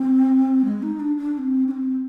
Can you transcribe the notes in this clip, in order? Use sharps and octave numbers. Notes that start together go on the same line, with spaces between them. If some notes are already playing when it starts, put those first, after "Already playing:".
Already playing: C4
G#3
D#4
D4
D4
D4
C4
D4
C4